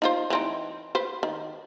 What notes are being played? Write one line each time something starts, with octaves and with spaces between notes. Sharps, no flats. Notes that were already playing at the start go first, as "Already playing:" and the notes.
D#4 F4 C5
E3 C4 D#4
B4 C5
D#3